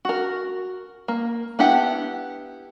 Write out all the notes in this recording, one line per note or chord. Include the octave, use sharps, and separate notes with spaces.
F#4 A#4
A#3
B3 D4 E4 G4 F#5